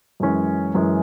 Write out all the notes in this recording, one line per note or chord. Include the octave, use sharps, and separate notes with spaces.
F#2 E3 G#3 C#4
F#2 E3 G#3 C#4